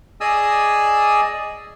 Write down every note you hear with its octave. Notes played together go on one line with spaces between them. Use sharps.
G#4 D5 D#5 G#5 D#6 E6